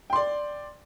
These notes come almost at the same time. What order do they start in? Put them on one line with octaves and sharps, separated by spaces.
G5 C6 D5